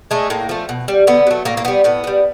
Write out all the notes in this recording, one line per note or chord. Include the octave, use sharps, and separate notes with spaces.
G#3 A3
A2 A#3
F3 A3
B2
G3
D3 B3
F#3 A3
A2 A#3
A#3
E3 G3 B3
A2 B3
E3
G3